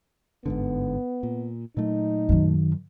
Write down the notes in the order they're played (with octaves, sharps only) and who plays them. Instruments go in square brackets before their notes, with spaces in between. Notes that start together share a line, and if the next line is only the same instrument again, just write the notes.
[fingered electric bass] G1 G#2 D3 [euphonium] B3
[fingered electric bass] A#2
[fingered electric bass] A#2 F#3 A3 [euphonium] D#4
[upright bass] F#2 D#3